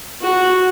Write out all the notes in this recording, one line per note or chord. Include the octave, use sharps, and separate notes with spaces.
F#4